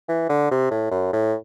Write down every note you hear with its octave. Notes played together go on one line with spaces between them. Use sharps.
E3
D3
C3
A2
F#2
A2